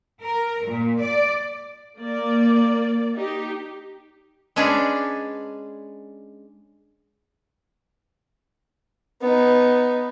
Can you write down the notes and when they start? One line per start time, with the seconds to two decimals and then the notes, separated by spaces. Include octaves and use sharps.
0.22 A#4
0.66 A#2
1.02 D5
1.98 A#3 D5
3.16 D#4 G4
4.56 G#3 C#4 D4 G#4 B4 D5
9.22 B3 D#4